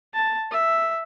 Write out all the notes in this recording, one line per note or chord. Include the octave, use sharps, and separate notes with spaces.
A5
E5